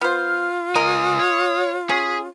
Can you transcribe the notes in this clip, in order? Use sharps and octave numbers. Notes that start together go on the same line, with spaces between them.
B3 F4 C5 F6
C#2 A#4 D#5 G#5 D#6
C#5
C#4 G#4 B6